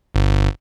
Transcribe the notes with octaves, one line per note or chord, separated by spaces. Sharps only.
G1